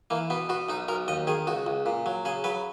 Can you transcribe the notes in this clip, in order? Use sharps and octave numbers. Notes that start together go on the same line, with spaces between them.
E3 A#3
B2 B3
B2 F#4
B1 D#4
B1 A#4
D#2 D#5
D#3 G#4
C#2 F#4
C#2
A#2
F#3
C#3 G#4
F#3 B4